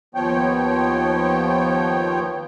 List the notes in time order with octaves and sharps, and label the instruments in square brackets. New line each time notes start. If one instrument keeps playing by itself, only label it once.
[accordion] D#2 F3 B3 C#5 G5